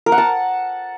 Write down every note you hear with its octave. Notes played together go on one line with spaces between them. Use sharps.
A#4
F#5
A5